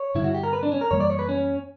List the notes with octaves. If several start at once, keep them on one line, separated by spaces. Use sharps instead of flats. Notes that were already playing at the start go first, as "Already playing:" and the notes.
Already playing: C#5
G2 D3 G3 E4
F#4
G4
A#4
B4
D4
C#4
A#4
F#2 E3 G3 A#3 C#5
D5
C#5
B4
C#4